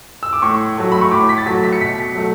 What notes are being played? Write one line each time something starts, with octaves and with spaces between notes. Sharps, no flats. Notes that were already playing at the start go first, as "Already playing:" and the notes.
E6
D6
A2 C#6
F#3 A3
B5
C#6
A2 D6
B6
A6
F#3 A3 B6
B6
C#7
B2 B6
F#3 A3